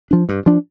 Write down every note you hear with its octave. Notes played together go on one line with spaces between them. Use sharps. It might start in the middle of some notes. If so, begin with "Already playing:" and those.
F3 D4
G2
F3 D4